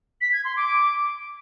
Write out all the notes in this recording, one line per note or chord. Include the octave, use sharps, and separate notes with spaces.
B6
G#6
C6
D6